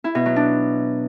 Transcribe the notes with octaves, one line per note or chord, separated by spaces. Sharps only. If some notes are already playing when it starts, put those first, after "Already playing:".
E4
B2
F#3
D4